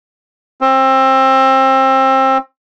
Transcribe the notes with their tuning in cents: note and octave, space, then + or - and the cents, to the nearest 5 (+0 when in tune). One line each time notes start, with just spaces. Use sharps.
C4 +25